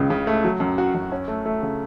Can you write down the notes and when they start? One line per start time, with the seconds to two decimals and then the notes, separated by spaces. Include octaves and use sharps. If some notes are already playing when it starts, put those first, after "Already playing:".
Already playing: C#2 C#3
0.10 C#3
0.27 A3
0.44 F#3
0.60 F#2
0.78 F#4
0.95 F#2
1.12 C#4
1.28 A3
1.46 A3
1.62 C#3